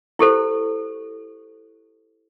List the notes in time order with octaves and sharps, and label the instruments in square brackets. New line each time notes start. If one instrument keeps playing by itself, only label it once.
[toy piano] E4 G4 A4 C5